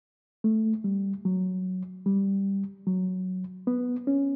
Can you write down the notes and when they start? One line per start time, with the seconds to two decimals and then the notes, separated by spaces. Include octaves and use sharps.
0.44 A3
0.84 G3
1.25 F#3
2.06 G3
2.87 F#3
3.67 B3
4.07 C#4